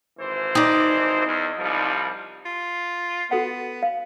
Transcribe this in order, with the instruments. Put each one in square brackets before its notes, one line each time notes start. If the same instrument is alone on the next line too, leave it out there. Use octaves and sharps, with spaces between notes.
[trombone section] G#1 E3 C5
[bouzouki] D#4 D5
[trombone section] E2
C2 F3 G3
[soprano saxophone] F4
[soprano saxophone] B3 [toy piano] F#4 A4 F#5
[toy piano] F5